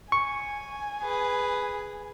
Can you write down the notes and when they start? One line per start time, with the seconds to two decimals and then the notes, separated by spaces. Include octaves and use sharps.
0.12 G#5 C#6
1.03 G#4 B4